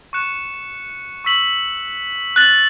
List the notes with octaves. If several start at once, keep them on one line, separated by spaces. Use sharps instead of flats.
C#6 F#6 C#7 E7
C#6 E6 B6 F#7
F#6 A6 F#7